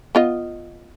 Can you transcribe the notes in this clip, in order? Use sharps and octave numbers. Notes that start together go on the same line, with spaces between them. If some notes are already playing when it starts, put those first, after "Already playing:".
B3 F4 D#5